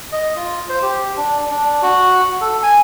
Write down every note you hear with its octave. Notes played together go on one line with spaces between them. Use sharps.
D#5
F4
C5
G4
D4
D4
F#4
A4
G#5